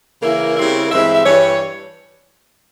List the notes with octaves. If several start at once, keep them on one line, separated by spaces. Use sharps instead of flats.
C#3 E3 A#3 E4 A#4
C#3 G3 C4 E4
G2 E3 G#3 C4 E4 E5
E5
G2 E3 G3 C#5